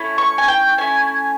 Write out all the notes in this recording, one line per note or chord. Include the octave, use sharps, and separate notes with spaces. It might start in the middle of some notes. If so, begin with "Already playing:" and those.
Already playing: A3 C#4 E4
C#6
G#5
G5
A3 C#4 E4 G#5